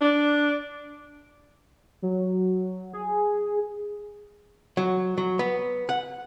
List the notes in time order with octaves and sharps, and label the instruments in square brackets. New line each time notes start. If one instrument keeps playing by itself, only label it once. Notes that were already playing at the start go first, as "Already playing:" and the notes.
[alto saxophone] D4
[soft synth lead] F#3
G#4
[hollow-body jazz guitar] F#3
F#3
B3
F#5